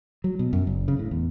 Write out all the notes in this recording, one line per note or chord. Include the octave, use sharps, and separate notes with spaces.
F#3
B2
F#2
F#1
C#3
A2
E2